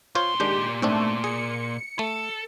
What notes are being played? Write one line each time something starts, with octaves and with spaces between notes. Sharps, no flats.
A#2 F4 C5 C#5 C6
D#3 G#3 D4 G4
G#2 A3 C4 D4
G#4 C#7
A3 A4